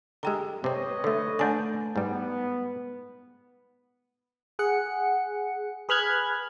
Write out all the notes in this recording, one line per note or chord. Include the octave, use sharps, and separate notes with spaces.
D3 G#3 G4 G5 A#5
C3 C4 B4 C#5 D#5
D3 A3
D3 A3 D4 D5 G#5
G#2 G3 B3
G#4 F#5 C#7
G#4 B4 B5 F6 F#6 G#6